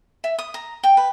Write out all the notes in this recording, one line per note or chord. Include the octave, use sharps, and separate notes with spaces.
E5
D#6
A#5
G5
B4